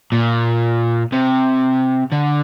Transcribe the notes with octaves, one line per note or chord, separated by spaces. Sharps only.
A#2
C3
D3